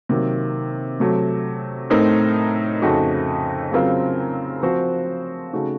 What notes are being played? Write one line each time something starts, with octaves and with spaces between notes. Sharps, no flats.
C3 D#3 F#3 A#3
C3 F#3 A3
A2 A3 C4 D#4 A#4
F2 C#3 A3 D#4 F#4
C#3 F#3 C4 F4 A#4
F3 C4 F#4 C5
C#3 A3 D#4 F#4